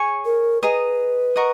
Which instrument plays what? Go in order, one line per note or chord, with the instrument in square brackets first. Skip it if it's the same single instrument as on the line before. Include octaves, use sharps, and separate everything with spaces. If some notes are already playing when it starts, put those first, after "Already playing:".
Already playing: [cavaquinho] G#4 C#5 G#5 C#6
[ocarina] A#4
[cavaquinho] G#4 D#5 A#5 [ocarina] B4
[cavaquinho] A#4 D#5 F#5 C#6